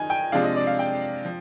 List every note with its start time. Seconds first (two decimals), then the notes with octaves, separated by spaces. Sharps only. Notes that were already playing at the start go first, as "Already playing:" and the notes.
Already playing: D#3 D#4 G#5
0.10 G5
0.32 C3 F3 G#3 D4 F5
0.44 D#5
0.56 D5
0.67 F5
0.79 G5
1.25 F3